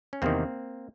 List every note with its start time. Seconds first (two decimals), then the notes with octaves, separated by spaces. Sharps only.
0.13 C#4
0.22 E2 C3 D#3 A#3 C4